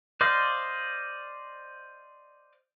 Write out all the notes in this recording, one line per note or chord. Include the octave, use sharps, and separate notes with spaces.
C5 D5 D#5 F5